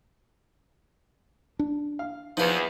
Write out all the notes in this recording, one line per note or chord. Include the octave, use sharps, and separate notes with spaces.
D4
F5
E2 F3 D#4 G#4 B4